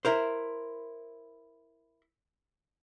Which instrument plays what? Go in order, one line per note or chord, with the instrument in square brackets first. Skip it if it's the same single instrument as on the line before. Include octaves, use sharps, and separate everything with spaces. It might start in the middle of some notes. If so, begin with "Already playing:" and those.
[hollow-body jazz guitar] E4 A#4 C5